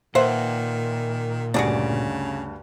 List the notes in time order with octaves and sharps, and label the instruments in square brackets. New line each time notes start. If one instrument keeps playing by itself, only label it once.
[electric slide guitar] A#2 [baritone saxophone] D#3 [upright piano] B4 E5 [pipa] C5 F#5
[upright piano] D2 G2 [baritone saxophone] C#3 [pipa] F#4 G#4 D5